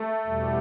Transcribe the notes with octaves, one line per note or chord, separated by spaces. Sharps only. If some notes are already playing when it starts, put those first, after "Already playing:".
Already playing: A3
E2 B2 G3